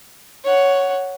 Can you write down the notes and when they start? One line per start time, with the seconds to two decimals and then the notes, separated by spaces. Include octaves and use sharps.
0.45 C#5 F#5